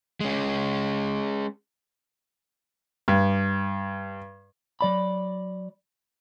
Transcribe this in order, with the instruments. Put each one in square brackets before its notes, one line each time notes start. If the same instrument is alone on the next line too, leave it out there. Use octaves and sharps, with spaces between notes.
[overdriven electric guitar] G#3 C#4
[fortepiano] G2
[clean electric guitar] F#3 D5 B5